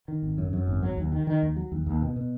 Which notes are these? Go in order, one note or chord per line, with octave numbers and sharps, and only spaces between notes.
D#3
G#1
F#2
F#2
G#1
F#3
D#2
D#3
D#3
D#2
F#3
D#2
D#2
B2
B2